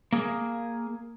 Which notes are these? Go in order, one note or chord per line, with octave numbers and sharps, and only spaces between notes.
A#3 G#4